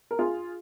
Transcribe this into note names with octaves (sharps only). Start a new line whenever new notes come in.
A#4
F4 G#4